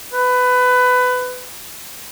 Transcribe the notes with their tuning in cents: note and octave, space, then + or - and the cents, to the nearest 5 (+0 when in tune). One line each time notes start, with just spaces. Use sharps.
B4 +20